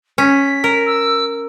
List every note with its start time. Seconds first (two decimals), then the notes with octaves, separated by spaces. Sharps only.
0.18 C#4 B6
0.64 A#4
0.86 E6